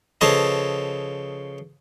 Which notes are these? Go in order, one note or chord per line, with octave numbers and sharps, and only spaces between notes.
C#3 F3 A4 B4 C#5 D#5